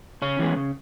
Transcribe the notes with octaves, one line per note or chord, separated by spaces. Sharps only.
C#3 C#4
E3 G#3 B3
C#3